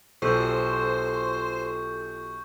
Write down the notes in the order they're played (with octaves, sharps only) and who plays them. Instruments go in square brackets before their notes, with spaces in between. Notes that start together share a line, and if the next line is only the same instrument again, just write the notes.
[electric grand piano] B1 [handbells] F4 G4 A4 [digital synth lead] C5 [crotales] C#6 G6